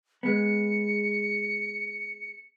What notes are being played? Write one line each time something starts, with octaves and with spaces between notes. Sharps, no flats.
G#3 B3 C#7